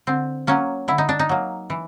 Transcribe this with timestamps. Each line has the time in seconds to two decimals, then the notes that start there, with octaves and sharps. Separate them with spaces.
0.07 D3 C4
0.47 F#3 A#3 C#4
0.88 D3 E4
0.98 D#4
1.09 D4
1.19 D#4
1.29 F#3 A#3
1.70 E3